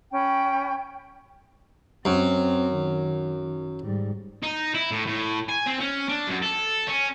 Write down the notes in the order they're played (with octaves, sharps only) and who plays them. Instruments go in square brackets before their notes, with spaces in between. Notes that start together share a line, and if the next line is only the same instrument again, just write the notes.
[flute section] C#4 G5 B5
[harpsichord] F#2 [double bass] C4
[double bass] D#3
G#2 G3
[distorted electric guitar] D#4
E4
A2
A2
G#5
C4
C#4
D4
F#2
A4
C#4